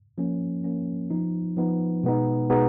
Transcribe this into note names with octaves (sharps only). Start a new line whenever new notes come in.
F3 A#3 C#4
F3 A#3 C#4
F3 B3 D#4
F3 B3 D#4
B2 G#3 B3 D#4
B2 G#3 B3 D#4